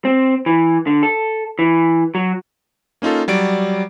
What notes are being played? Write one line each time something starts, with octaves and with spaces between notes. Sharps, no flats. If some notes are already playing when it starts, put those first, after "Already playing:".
C4
E3
D3
A4
E3
F#3
A#3 C#4 D#4 F4 A4
F#3 G3 D5 D7